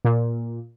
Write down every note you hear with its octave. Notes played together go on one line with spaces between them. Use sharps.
A#2